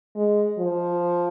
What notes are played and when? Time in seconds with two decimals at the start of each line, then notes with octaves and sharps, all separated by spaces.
0.15 G#3
0.58 F3